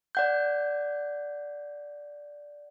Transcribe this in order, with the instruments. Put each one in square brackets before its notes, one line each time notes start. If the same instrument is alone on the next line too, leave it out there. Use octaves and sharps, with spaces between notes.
[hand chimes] D5 F#5 G6